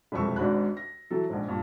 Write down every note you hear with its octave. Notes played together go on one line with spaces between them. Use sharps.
E1 C2 F2 C#6 E6
G#1 G#2 D4 F#4 B5 F#6
A#6
E3 F#3 A4
A#1 G#2
G2 A#2